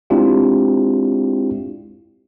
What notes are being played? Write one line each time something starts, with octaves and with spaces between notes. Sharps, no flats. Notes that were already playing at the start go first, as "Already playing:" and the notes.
G#3 C4 D4 E4 F4 G4